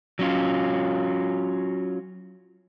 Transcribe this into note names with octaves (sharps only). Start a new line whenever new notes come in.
F#3 C#4 F4